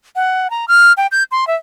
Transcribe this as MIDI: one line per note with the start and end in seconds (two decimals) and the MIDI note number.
0.16 0.50 78
0.50 0.66 82
0.68 0.93 89
0.97 1.07 79
1.12 1.24 91
1.31 1.47 84
1.47 1.55 76